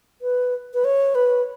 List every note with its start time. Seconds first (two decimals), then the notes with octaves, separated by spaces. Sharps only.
0.22 B4
0.74 B4
0.85 C#5
1.15 B4